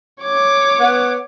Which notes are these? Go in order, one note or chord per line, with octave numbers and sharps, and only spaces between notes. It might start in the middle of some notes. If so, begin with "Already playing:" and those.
C#5 D6
B3